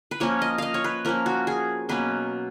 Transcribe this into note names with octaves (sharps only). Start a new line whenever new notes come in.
B4
F3 A#3 C#4 C#5
D#5
D#5 F5
C#5
B4
F3 A#3 C#4 A#4
F#4
G#4
B2 F#3 A#3 C#4 B4